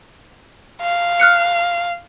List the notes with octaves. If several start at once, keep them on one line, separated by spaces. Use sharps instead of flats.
F5
F6 F#6 C#7